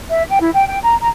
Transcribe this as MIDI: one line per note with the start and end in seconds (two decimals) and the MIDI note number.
0.09 0.22 76
0.29 0.38 79
0.41 0.50 64
0.53 0.66 79
0.68 0.77 79
0.82 0.95 82
1.00 1.08 82